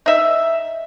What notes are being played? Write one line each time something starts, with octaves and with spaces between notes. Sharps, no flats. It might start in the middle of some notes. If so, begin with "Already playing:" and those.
D#4 E5